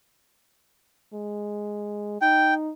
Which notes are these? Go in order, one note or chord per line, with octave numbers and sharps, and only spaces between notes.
G#3
D#4 G5